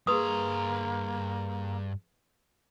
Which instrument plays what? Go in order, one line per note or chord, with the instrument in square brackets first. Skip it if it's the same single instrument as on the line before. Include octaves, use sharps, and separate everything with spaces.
[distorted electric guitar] G2 A#5 [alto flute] A#3 [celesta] G#4 C6 C#6 [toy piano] B4 D#6